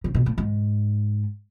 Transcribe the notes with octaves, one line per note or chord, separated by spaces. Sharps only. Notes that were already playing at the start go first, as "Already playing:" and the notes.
C#3
B2
A2
G#2